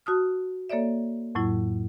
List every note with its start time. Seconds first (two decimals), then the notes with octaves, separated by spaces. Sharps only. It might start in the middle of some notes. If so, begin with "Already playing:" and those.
0.06 F#4 A5 D#6 F6
0.70 A#3 A4 C#5 D5 E5
1.35 F2 A2 F#3 E4